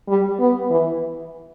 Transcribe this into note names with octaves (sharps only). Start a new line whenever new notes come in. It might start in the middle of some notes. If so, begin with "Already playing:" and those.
G3
B3
E3